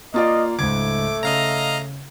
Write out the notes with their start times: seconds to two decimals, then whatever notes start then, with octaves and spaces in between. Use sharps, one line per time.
0.14 A#3 F4 D5 D#5
0.59 C#2 G#2 A3 D6 G#6
1.23 C#3 D#5 F5 A#5